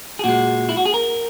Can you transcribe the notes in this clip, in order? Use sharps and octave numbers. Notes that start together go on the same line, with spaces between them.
G#4
A#2 G#3 F#4
E4
F#4
G#4
A#4